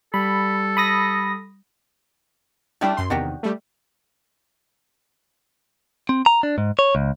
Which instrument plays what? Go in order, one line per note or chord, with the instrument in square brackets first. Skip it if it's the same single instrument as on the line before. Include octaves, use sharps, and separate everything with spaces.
[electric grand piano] G3 [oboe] A4 [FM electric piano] B5
[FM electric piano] B5 D#6 A#6
[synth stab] G3 D4 E4 [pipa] A3 C#4 G4
[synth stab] F#2 C6
[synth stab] E2 C3 D#3 [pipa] D4 F#4 G4
[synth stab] G3 A3
[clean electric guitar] C4
A#5
D4
G#2
C#5
C#2